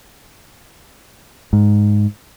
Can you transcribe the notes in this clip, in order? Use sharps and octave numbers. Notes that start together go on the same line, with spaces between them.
G#2